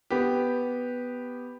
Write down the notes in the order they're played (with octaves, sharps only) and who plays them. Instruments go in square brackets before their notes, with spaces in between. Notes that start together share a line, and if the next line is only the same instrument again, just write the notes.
[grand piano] B3 G4